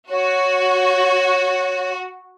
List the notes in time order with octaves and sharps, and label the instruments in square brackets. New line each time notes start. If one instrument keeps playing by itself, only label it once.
[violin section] F#4 [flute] C#5